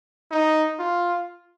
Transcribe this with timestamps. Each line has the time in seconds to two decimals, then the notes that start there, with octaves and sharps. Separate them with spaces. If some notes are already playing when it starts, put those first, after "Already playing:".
0.31 D#4
0.79 F4